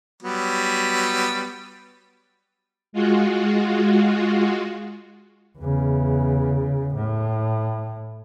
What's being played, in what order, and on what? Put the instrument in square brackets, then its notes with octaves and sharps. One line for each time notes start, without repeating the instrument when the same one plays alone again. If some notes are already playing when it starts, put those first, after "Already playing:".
[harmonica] F#3 G3 B3
[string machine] G#3 F4 F#4
[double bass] E2 C#3
A2